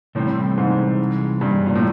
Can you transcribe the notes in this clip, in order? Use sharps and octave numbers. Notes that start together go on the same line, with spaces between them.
A2 C3 E3 G3 C4
G#2
G2
A#2
A2